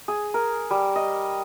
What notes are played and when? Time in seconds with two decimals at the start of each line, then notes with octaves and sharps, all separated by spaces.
0.08 G#4
0.34 A#4
0.71 G3
0.96 D#5